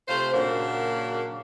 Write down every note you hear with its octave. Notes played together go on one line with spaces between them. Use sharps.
C3 A3 F4 C5
A#2 C#3 F#3 A#3 D4 F#4